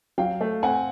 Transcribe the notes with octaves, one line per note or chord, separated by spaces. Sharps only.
F#3 F5 G5
A3
C4 F#5 G#5